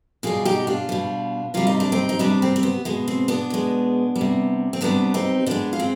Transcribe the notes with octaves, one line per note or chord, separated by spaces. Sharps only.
B2 G3 F4 G#4
D#4 G4
D4 F4
B2 G3
C3 G3 F4
D#4
D4
C4 D#4
D#4
C3 G3 B3 D4
C4
C4
B3
B2 G#3 B3
C4
B3 D4
B2 G#3
G3
C3
C4
C3 G3 B3 D4
C4 D#4
D3 G#3 B3 D4
F4
C4